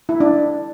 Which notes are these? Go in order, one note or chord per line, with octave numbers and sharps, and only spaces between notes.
E4
D4